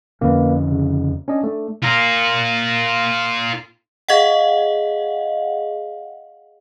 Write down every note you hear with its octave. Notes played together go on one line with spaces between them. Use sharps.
F2 D3 A#3 C#4 B4
C#3
C#4 D4 D#5
A3 D4
F4 A#4
G#4 D#5 F5 F#5